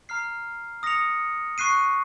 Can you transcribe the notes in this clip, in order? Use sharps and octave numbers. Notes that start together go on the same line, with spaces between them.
A#5 F6 C7
D#6 A#6 C#7 F7
C#6 F#6 C7 D#7